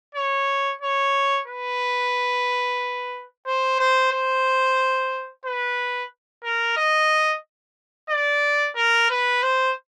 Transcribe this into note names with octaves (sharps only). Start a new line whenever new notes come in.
C#5
C#5
B4
C5
C5
C5
B4
A#4
D#5
D5
A#4
B4
C5